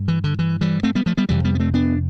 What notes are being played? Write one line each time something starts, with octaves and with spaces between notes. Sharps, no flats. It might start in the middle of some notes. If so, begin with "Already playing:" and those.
Already playing: G2
E3
D3
E3
E3 G3
A3 C4
G3 B3
F3 A3
G3 B3
F2 C3 E3 G3
G3 B3
B3
A3 C4
B3 D4